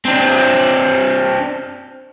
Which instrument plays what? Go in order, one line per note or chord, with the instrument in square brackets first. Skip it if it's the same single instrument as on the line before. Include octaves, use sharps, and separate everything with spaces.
[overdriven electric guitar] C4 D4